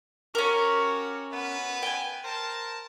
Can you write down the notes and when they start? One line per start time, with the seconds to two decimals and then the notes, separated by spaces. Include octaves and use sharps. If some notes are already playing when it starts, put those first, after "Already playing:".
0.35 C#4 F#4 G4 A#4 C#5
1.32 F#2 B3 B4
1.83 G5 G#5
2.24 A#4 C5 A5